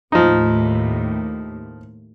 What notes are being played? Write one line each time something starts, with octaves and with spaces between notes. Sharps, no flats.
D#2 A2 F3 D#4